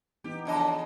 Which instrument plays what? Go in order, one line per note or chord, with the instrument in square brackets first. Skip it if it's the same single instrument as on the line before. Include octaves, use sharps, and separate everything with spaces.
[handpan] E3 B3 D#4 [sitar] G4
[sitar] F2 C#3 D#5 [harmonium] D4